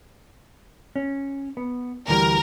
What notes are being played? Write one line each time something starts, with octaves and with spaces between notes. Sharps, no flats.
C#4
B3
D2 E3 G3 A#4